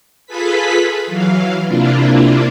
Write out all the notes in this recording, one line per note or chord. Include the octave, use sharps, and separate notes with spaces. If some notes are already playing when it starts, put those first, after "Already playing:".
F4 G#4 A4 B4 B5 B6
E3 F#3 F5
C3 A#3 D4 E4 F4